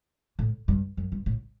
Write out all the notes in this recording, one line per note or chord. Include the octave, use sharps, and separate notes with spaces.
A2
G2
F#2
G2
A2